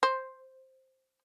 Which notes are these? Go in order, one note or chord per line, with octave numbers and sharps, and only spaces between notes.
C5